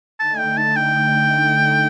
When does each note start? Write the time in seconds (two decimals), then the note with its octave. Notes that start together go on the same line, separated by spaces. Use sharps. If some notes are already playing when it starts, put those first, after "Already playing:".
0.19 D3 A3 D#4 A5
0.38 G5
0.57 A5
0.76 G5